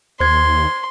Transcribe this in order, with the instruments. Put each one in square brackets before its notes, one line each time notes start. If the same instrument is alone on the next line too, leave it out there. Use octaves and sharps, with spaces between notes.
[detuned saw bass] D#2 [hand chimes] C5 G#6 [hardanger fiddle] C6